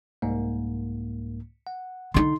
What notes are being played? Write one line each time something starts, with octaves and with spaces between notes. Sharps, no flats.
C2 G#2 A#3
F#5
D3 D#4 C6